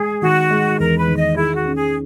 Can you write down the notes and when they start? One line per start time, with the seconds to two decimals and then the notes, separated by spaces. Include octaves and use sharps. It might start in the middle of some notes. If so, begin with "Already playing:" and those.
Already playing: G#3 G#4
0.22 D#3 F#4
0.51 G#3
0.79 E2 A#4
0.98 B4
1.08 D#3
1.18 D#5
1.37 E4 G#4
1.56 F#4
1.65 C#4
1.75 G#4